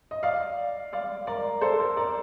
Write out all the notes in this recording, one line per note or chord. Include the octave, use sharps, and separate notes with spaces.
D#5
D5 F5
D5 F5
A#4 D5
A4 C5
A#4
A#4 D5